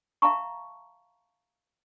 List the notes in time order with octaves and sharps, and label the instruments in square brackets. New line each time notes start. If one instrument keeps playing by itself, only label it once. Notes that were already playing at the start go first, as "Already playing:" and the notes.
[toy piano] E5 F5 A5 A#5 C#6